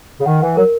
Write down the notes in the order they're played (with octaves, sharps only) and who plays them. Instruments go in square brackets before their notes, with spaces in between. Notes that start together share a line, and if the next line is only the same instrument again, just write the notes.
[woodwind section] C#3
[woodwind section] D#3 [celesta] F#5
[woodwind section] E3 [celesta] F#5
[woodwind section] F#3 [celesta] A#4